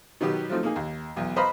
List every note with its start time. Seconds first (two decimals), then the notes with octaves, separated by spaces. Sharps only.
0.21 B2 D#3 F#3 B3 G4
0.49 F3 F#3 A3 C4 D#4
0.63 A#3 D#4 G#4
0.76 D#2
1.16 B1 E2
1.36 B4 C5 D#5 F5 A#5 B5